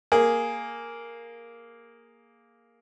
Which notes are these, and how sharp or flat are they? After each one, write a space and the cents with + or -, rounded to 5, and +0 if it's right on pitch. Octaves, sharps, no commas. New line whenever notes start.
A#3 +0 G#4 +0